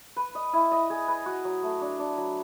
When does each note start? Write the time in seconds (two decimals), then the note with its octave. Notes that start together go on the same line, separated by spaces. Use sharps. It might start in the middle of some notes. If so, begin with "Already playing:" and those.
0.16 B4
0.35 D#5
0.53 E4
0.72 D#5
0.90 G#4
1.08 B4
1.26 F#4
1.45 F#3
1.63 A3
1.81 D4
1.99 D4
2.18 F#3